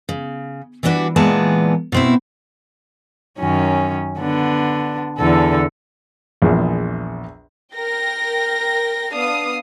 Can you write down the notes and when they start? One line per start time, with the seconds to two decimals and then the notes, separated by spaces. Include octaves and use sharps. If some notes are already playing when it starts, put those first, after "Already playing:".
0.09 C#3
0.83 E3 G3 B3 D4 F#4 B4
1.16 A#2 E3 G#3 B3 D5 A5
1.92 B2 C4 E4
3.39 F#2 D#3 C#4
4.19 D3 B3 D4
5.18 E2 D3 A4
6.42 A#1 E2 F3 G#3
7.74 A#4 G5 A#6
9.12 B3 D4 F5 D#6